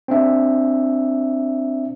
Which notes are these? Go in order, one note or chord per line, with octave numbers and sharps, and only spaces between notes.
C4 D4 E5